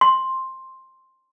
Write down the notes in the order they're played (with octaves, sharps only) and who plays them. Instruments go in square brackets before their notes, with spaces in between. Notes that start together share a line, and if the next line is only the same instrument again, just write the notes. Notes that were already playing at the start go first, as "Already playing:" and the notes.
[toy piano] C6